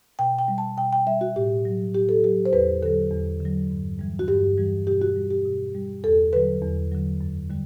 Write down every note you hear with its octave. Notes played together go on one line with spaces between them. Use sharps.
B2 G5
G5
G3
A5
B2 G5
G5
G3 E5
F#4
A2 G4
F#3
A2 G4
A4
F#3 G4
C5
E2 B4
D3 F#3 A4
E2
D3 F#3
G2
E3 G3
F#4
G2 G4
E3 G3
B2 G4
F#4
G3
G4
B2
G3
E2 A4
D3 F#3 B4
E2
D3 F#3
F#2
D3 G3